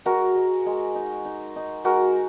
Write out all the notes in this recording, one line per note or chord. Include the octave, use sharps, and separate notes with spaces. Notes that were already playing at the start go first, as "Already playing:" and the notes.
G#3 F#4 A#4
G#3
G#3
D#4
D#4
D#4
G#3 F#4 A#4